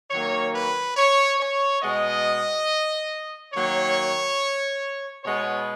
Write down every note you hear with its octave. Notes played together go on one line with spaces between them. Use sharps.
D#3 F#3 A#3 C#5
B4
C#5
C#5
B2 G#3 B3 D#5
D#3 F#3 A#3 C#5
B2 G#3 B3 C#5